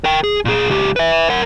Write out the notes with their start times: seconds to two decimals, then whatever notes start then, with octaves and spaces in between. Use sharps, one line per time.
0.04 A#4 G5
0.24 G#4
0.45 A#2 G#4
0.70 C#2 G4
0.96 B4 E5
1.30 A#4 F#5